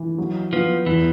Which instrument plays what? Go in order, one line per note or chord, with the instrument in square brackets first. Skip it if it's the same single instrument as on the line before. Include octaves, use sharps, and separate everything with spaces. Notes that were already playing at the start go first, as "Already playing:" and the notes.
Already playing: [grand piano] E3
F#3
[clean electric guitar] F3 [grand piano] B3
[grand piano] E2 [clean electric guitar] E3